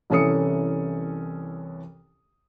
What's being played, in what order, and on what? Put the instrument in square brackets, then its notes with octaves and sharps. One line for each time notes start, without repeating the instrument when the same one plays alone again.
[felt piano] C2 E3 C#4 A4 D#6 C#7